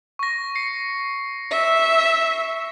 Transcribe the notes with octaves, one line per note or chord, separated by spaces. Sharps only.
C#6 A#6
C7 C#7
E5